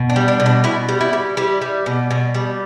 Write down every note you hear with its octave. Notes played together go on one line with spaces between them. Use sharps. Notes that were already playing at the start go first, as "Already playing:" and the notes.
Already playing: B2
D4
G3
D4
B2
D4
B2 E4
G3
E4
G3
G3 E4
G3
B2
B2
G3